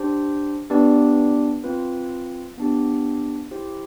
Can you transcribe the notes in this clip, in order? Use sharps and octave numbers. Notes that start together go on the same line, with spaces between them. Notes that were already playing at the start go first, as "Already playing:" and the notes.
Already playing: D4 G4 C5
B3 D4 G4 B4 D5
C4 F4 B4
B3 D4 G4
E4 G4 C5